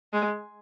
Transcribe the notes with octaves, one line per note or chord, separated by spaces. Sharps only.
G#3